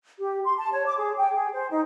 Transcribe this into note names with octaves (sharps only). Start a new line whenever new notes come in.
G4
C6
A5
C#5
D6
G#4
G5
G#4
C5
D#4